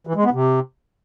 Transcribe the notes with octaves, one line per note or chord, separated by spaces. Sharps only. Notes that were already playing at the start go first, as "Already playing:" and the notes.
E3
G#3
B3
C3